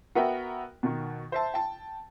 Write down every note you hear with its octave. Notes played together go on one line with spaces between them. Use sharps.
B3 F#4 A#4 E5 G5
B2 D#3
C5 E5 A5
G5 A5